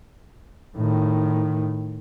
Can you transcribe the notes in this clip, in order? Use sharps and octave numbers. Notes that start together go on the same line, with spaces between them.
A2 D#3